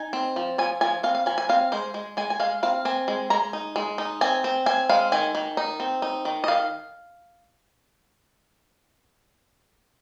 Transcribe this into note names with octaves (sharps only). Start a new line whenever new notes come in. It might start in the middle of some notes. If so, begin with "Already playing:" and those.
Already playing: D#4 G#5
C4
F3
F3 G#5
F3 G#5
C4 F5
F5
F3 G#5
G#5
C4 F5
G#3 C5
G#3
G#3 G#5
G#5
G#3 F5
C4 F5
C4 G#5
G#3
G#3 A#5
D#4
G#3
D#4
C4 G#5
C4
C4 G#5
G#3 F5
D#3 G#5
D#3
D#4
C4
D#4
D#3
D#5
D#3 F5